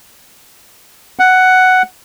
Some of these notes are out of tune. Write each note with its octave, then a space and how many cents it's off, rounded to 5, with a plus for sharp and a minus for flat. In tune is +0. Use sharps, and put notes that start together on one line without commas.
F#5 +5